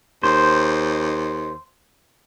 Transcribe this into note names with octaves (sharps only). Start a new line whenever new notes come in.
D#2 C5